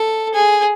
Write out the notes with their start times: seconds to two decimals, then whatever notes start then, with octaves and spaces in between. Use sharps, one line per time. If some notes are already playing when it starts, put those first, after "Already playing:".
Already playing: A4
0.34 G#4